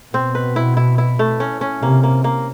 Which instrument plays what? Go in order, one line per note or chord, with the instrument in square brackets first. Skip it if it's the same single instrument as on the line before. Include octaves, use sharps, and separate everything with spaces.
[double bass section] B2 [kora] C4
[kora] B4
E4
E4
E4
A3
C#4
C#4
[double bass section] C3 [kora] A#3
[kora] A#3
A#3